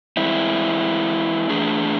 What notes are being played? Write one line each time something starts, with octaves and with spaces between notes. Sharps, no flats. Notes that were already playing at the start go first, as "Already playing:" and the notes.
E3 G#3 C4 E4
E3 A3 D4 G#4